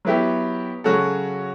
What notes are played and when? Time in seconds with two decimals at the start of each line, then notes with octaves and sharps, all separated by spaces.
0.05 F#3 B3 E4 G4
0.84 C#3 F#3 C#4 F#4 A4